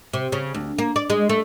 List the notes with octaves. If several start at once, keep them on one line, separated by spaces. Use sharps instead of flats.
C3
C#3
D2
A#3
D5
G#3
A3